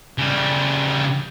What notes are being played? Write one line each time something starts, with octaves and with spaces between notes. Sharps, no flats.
C#3 G3